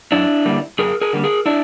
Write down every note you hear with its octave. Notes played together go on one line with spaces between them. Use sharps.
F#2 D4 E4
D3 G3 A#3
F#2 G#4 A#4
G#4 A#4
D3 G3 A#3
G#4 A#4
D4 E4